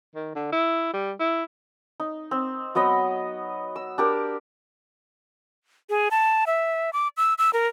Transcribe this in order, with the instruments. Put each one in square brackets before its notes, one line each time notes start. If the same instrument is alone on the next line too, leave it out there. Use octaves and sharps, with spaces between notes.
[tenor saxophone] D#3
D3
E4
G3
E4
[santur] D#4
C4
F#3 B3 D#5 B5
E6
D4 G4 A#4
[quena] G#4
A5
E5
D6
E6
E6
A#4